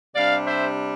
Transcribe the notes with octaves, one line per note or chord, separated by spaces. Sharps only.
C3 G3 D4 D5 F5
C5 E5